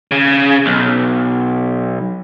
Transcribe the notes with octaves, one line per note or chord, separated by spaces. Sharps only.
C#3
B1